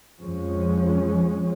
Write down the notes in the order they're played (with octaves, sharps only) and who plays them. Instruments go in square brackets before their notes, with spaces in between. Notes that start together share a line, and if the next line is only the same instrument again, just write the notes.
[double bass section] F2 F3 G#3 C#4